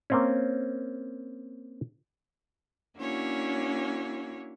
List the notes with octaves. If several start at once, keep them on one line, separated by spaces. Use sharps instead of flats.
A#3 C4 C#4
A#3 C#4 D4 E4 F#4 C#5